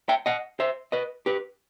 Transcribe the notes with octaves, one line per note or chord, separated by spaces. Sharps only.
E5 G5
D#5 F#5
C5 E5
B4 D#5
G4 B4